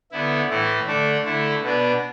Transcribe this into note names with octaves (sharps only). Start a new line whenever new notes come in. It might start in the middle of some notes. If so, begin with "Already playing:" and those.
D3 B3 E4
A2 E3 A3 E4
D3 A3 D4
D3 A3 E4
B2 B3 D4